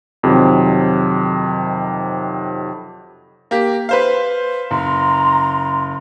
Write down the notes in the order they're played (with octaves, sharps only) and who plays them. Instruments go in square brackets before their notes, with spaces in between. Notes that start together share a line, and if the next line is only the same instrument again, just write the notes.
[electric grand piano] F2 C3 D#3 F#3
[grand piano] A#3 G4
B4 C5 F5
[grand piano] F#1 [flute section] A#5 C6